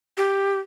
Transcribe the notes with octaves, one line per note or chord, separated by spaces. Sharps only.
G4